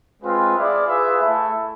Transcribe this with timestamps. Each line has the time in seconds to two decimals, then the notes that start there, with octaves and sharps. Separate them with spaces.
0.23 G#3 C4 F4 B4 F5
0.55 E4 G#4 D5 F5
0.87 F4 G#4 B4 E5
1.20 A3 E4 A4